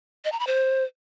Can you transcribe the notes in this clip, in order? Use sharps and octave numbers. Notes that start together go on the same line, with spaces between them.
D#5
A#5
B5
C5